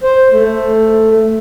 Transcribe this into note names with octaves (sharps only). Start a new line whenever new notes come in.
C5
A3